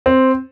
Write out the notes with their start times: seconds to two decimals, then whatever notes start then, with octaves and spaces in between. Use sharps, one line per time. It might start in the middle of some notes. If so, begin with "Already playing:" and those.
0.06 C4